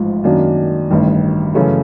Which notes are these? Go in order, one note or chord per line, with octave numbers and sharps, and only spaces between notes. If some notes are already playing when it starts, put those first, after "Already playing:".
Already playing: A1 G#2 F3
F#2 D#3 F#3 A#3 D4
A1 G2 D#3
F#2 C#3 E3 A3 C#4